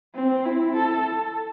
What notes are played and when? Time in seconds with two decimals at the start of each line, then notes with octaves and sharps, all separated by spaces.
0.15 C4
0.46 E4
0.76 A4